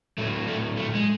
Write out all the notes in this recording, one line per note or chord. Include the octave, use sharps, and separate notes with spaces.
A2 F#3 A3
A3
A3
G#3